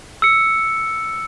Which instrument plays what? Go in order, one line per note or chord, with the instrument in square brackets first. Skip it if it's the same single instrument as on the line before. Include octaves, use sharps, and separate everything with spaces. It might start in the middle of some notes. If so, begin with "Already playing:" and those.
[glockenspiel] E6 C#7